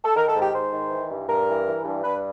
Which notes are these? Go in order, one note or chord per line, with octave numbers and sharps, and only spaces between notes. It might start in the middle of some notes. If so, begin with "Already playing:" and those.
A4
D#3 A#4
A4
G#2
G4
G#2 C5
D#3
E3
G2
G2 A#4
E3
E3
G2
G2 B4